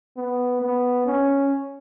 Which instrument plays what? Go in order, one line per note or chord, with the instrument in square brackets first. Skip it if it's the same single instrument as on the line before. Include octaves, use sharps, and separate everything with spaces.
[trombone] B3
B3
C#4